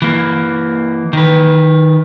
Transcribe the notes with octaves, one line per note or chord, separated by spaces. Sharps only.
E3 A#3
D#3 B4